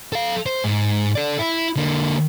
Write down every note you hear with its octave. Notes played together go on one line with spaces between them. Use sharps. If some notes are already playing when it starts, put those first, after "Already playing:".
A4 F5
C5
G#2
A4 D5
E4
D3 A#3